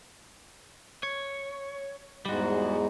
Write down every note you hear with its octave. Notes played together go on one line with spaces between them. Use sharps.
C#5
E2 G#2 G3 G#3 F#4